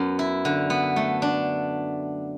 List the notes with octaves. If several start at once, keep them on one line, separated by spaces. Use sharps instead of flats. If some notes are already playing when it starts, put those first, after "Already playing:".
Already playing: F#2 B3
E4
D3
B3
A3
D4